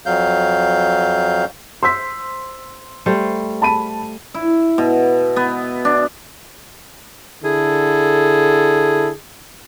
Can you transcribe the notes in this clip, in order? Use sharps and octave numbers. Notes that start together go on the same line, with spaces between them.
F2 F#3 F5 G6
C5 C6 E6 B6
G3 A3 C5
A5 B5 D#7
E4
B2
B3
D4
D3 E4 G#4 A4